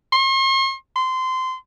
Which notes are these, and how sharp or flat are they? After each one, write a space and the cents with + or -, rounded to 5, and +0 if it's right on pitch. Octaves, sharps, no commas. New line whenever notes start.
C6 +45
C6 -20